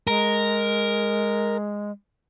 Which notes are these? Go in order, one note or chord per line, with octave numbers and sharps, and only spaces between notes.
G#3 A#4